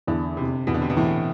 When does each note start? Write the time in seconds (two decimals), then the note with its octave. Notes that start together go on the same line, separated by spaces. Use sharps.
0.07 E2 D3
0.37 F1 C3
0.67 E2 B2
0.74 D3
0.82 C3
0.90 B2
0.97 A2 E3